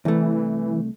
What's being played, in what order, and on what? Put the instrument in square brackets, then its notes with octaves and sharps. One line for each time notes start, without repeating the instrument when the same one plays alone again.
[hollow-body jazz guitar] C2 A3 [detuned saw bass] E3